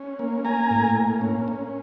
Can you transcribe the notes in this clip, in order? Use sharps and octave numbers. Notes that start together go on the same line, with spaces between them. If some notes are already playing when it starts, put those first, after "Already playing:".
Already playing: C#4
A#3
A#3 G#5 A#5
A2
A#3
C#4
C#4